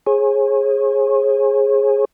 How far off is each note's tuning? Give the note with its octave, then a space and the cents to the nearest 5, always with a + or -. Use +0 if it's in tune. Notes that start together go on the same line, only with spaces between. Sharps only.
G#4 +0 C#5 -40